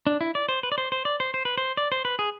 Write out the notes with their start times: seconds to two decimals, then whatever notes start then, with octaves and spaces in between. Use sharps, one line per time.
0.07 D4
0.21 E4
0.35 D5
0.49 C5
0.63 B4
0.72 D5
0.78 C5
0.92 C5
1.05 D5
1.20 C5
1.34 C5
1.45 B4
1.58 C5
1.77 D5
1.92 C5
2.05 B4
2.19 G#4